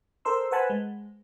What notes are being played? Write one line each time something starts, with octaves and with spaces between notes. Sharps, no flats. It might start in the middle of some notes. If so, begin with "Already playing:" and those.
A4 A#4 C5 C6 E6
B4 C5 F#5 G#5 A5 B5
G#3